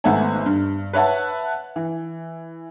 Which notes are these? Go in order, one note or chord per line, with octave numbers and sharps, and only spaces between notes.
G#1 A3 B3 E5 F#5 G#5
G2
B4 C#5 E5 F#5 A5
E3